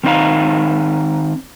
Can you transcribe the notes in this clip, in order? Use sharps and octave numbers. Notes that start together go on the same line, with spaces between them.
D#3 C4 D#4 B4 F5 A#5